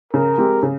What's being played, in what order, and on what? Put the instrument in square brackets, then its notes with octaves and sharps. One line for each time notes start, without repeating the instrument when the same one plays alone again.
[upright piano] C#3 [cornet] A#4
[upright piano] G#3 C4 G4
C#3